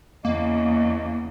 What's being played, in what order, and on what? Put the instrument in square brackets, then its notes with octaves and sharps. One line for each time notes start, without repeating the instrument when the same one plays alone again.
[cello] E2 C#3 [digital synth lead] A#3 [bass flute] D#5